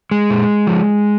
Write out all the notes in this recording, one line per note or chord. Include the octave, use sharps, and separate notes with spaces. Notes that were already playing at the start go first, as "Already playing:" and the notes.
G#3
A#2
F3